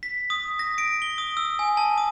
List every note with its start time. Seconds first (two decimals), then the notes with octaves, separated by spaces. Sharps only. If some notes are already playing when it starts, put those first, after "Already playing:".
0.03 B6
0.30 D#6
0.59 A#6
0.78 D7
1.02 G7
1.18 D#6
1.37 E6
1.59 G#5
1.77 A5
1.98 D#6